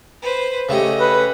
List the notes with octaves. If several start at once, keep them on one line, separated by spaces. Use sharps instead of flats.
B4 C5
C#3 A3 C#4 G4 D#5
B4